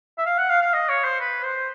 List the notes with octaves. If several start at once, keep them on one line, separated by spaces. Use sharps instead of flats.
E5
F5
F#5
F5
F5
D#5
C#5
C5
B4
C5